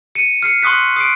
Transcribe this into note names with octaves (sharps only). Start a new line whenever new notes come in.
C#7 D#7
F6 C7 C#7
C6 C#6 D#6 F#6 B6
D#6 C7 D7